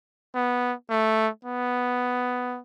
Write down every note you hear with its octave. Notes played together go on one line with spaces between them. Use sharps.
B3
A3
B3